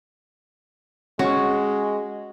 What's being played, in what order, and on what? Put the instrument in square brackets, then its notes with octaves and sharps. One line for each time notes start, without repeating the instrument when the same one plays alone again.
[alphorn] G#3 [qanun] C#4 [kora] F#4